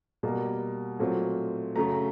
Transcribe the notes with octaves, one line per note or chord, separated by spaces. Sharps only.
B2 G3 A#3
A#2 F#3 A3 C4
F#2 C#3 F#3 A3 A#5